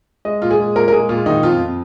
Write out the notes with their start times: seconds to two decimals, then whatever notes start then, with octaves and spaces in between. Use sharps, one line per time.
0.25 G#3 D#5
0.42 A#2 F4
0.51 G#4
0.60 G#3
0.76 A#2 A#4
0.88 A#4
0.92 G#3 G#4
1.09 A#2 F4
1.26 D#3 D#4
1.43 F2 F4
1.59 F2